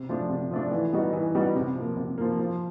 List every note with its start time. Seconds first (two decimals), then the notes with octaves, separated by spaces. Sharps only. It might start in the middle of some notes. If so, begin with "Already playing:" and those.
Already playing: C3
0.09 F3 A3 D4
0.29 C3
0.51 F3 A3 D4
0.71 E3
0.93 G3 B3 D#4 F#4
1.13 E3
1.35 G3 B3 D#4 F#4
1.56 C3
1.75 F3 A#3
1.97 C3
2.18 F3 A#3
2.39 F3